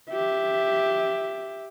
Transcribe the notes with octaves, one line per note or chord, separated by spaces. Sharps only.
G4 E5